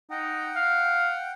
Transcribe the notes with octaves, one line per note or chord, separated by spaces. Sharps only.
D#4 F#5 G5
F5